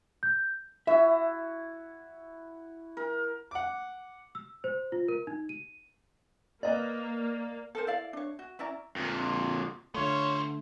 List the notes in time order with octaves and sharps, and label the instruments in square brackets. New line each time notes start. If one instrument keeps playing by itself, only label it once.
[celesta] G6
[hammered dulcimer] E4 F#4 [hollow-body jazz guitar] E5
[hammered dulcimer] A#4
[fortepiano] F#5 D6
[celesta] E6
C5
F4
A#4
D#4
D#7
[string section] A#3 [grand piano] B4 D#5 [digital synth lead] D5
[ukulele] A4 A#4 C5
E4 D5 F5
D4 C#5
F#4
C#4 E4 D5 A#5
[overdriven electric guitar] F2 A#2
[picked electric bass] D3 A3 [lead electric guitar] B3 C5 [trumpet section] F4 C#5